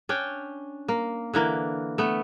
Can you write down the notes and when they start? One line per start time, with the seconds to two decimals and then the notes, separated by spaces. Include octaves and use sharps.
0.09 C#4 D4 G5
0.88 A#3
1.34 D3 E3 A#3
1.98 A3 B3